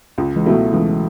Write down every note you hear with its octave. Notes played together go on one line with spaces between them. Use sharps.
C#2
E3 G#3
B2 F#3 A3 E4
C#2 E3 G#3